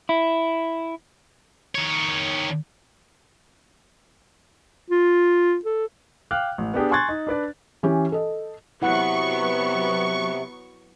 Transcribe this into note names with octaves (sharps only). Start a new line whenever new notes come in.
E4
D#3 C#5
F4
A4
F5 G5 D6 F6 F#6
A1
B3 D4 G4 G#4
G#5 C6 C#6 F#6 G#6 A6
D#4
D4 B4 D5
E3 C#4 G4
A4 D#5
C3 F#3 B3 E4 F#5 C#6